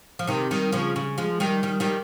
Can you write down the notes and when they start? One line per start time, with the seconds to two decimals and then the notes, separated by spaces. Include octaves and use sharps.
0.19 F3
0.27 C3 D#3
0.51 D#3 G3
0.72 C#3 F3
0.96 C#3
1.18 F3 G#3
1.40 D#3 G3
1.63 D#3 G3
1.80 D#3 G3